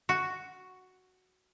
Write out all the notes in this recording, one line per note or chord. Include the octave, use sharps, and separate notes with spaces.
F#4